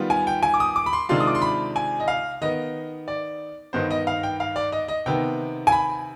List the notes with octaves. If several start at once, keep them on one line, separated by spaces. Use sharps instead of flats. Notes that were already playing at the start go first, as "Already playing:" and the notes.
Already playing: D#3 G3 B3 F4
G#5
G5
G#5
D6
D#6
D6
B5
C6
C3 D#3 G#3 D4 F4 C6
D#6
D6
C6
B5
G#5
D#5
F5
D#3 B3 D#4 D#5
D5
G2 D#3 B3 D#4 C5
D#5
F5
G5
F5
D5
D#5
D#5
C3 D#3 B3 G5
G#5
B5